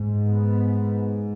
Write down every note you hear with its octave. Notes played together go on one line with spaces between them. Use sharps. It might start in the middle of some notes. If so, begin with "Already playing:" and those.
Already playing: G#2
B3